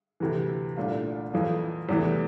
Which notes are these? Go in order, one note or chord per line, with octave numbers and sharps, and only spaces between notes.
D2 C3 E3
C2 A#2 A3 D4 F4
F2 E3 A#3 F4
E2 C3 E3 A3